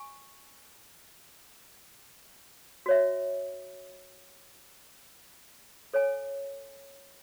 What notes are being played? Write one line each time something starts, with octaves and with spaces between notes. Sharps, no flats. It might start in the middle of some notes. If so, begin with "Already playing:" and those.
Already playing: G#5 C#6
F#4 C#5 E5
A4 C#5 G#5